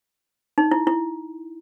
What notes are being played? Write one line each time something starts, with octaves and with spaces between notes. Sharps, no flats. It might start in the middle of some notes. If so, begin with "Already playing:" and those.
D#4
E4
E4